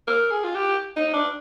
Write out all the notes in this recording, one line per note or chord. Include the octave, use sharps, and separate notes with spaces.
A#4
G#4
F4
G4
D#4
D4